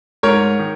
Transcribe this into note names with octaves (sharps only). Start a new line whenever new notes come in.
G#2 A#4 C#5
D#3